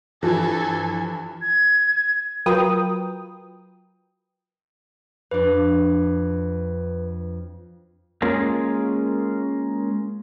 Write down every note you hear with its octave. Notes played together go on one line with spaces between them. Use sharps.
G2 E3 F3 A4 G#5
G#6
F#3 F4 A#4 B4 G5 D#6
F2 D4 B4
G#3 A#3 C#4 F4 G#4 A#4